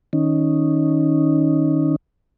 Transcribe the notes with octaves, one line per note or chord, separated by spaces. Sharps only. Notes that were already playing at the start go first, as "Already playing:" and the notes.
D#3 C#4 D#4